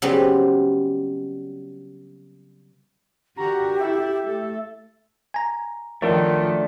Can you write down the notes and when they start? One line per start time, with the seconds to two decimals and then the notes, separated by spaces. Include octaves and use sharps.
0.02 C#3 F#3 G3 B3 C4 G4
3.37 D3 F#4 G4 A#4 A#5
3.80 E4 A4 E5
4.22 A3 A4
5.34 G#5 A#5
6.02 D#3 F3 A3 D4 F4 A4 A#4 C#5